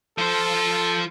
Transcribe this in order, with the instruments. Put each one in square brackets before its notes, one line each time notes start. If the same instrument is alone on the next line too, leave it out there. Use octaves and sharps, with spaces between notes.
[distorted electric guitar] F3 C5 [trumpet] A4